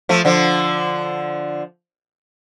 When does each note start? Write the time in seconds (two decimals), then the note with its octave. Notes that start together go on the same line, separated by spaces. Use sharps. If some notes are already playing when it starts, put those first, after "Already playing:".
0.09 F3 A3
0.25 D3 F3